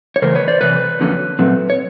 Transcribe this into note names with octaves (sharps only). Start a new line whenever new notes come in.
C#5
C#3 E3 A3 A#4 C5
B4 C#5
C5 D5
C3 E3 B4 C#5
F2 D3 F#3 A#3 C#4
A#2 F#3 A3 C4
C#5